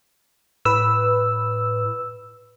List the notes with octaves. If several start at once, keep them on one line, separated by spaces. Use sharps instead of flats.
A2 B4 E6